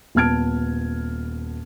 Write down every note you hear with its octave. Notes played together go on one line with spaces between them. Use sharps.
D#1 B3 A5 F6 G#6 D7